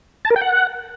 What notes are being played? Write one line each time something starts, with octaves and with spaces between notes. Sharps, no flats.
A5
A#4
G5
F#5